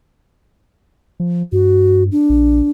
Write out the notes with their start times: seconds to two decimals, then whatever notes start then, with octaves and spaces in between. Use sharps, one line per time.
1.20 F3
1.52 G2 F#4
2.12 D4
2.30 A#1